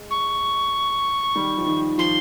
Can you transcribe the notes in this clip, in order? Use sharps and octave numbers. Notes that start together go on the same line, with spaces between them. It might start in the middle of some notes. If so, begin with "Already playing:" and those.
Already playing: G#3
C#6
D#3 G3
F3
D#3
F3 C6